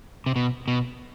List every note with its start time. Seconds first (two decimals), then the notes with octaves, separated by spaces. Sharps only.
0.26 C3
0.36 B2
0.68 B2